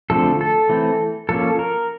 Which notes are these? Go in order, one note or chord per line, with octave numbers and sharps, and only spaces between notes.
D3 F3 A3 C4 A4
A4
E3 A3 C4
F3 A#3 C#4 A4
A#4